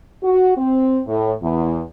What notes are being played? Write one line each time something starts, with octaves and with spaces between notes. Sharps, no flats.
F#4
C4
A2
E2